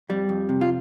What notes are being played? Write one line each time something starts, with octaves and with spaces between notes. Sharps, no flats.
F2 G3
F2
C3
F4